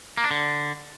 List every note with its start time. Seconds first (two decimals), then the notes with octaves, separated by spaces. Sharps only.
0.17 A#3
0.24 D4
0.31 D3